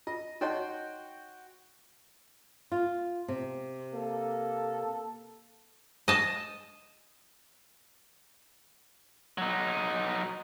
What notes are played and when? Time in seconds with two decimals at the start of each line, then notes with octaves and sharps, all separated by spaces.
0.07 F4 D#5
0.41 D#4 F#4 C#5 D#5 G5 C6
2.72 F4
3.28 C3
3.93 A#3 A4
6.08 D#5 A5
9.38 F#3 D#4